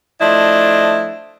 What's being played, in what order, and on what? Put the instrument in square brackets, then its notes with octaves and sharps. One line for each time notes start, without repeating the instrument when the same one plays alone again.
[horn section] F3 A3 D4 E4 D#5